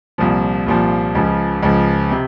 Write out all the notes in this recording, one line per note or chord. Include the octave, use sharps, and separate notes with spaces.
C2 A#2 F3
C2 A#2 F3
C#2 C#3 F3
C#2 C#3 F3
C3